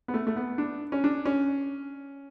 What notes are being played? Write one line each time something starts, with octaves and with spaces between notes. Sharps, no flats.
B3
A3
A3
B3
D4
C#4
D4
C#4